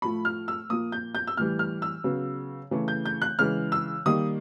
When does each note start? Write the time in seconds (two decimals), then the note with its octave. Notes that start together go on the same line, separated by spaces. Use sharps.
0.02 A2 F3 A3 B5
0.25 F6
0.48 E6
0.70 A#2 F3 A#3 D#6
0.92 G6
1.15 G6
1.27 E6
1.37 A2 E3 G3 F6
1.59 F6
1.82 E6
2.04 C#3 F#3 B3
2.71 C#3 E3 A3
2.88 G6
3.06 G6
3.22 F#6
3.39 C#3 E3 G#3 F6
3.72 E6
4.06 D#3 G3 A#3 D#6